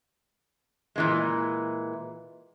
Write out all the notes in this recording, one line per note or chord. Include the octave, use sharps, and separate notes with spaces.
A#2 E3 G#3